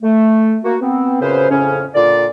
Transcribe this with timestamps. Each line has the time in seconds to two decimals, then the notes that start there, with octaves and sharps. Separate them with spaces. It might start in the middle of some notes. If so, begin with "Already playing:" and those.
0.02 A3
0.64 A#3 F#4
0.81 B3 C4
1.21 F#2 A#2 C#3 C#4 B4 C5
1.50 F2 A2 C#3 C#4
1.95 A#2 D3 F4 D5